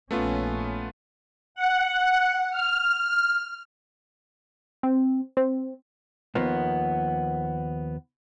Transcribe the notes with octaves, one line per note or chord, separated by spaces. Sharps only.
A#1 A3 B3 C#4 F4
F#5
F6
C4
C4
D#2 F3 A#3 B3